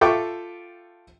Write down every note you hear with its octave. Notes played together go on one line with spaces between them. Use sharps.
F4 A4 E5 G5 C#6 D6